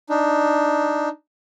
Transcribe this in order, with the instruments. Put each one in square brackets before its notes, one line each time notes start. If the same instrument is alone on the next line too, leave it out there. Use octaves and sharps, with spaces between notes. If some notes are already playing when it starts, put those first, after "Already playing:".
[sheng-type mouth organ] D4 D#4